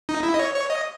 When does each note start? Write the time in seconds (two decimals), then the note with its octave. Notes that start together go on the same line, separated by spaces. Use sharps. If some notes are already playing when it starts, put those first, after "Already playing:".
0.09 D#4
0.23 E4
0.34 D#5
0.39 C#5
0.55 C#5
0.70 D#5